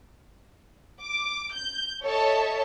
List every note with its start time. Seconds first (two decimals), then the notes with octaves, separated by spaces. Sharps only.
1.01 D6
1.53 G6
2.03 A4 C#5 D#5 E5 A5